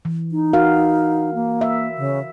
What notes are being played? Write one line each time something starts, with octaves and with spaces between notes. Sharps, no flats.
E3
D#4
F#4 A#4 F5
A#3
E5
C#3